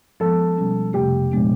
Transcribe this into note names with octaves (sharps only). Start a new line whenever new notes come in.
F3 G#3 B3 A4
B2 G3 A#3 C#4
F2 C3 F3 A3 G4
A#2 F3 G#3 B3 D4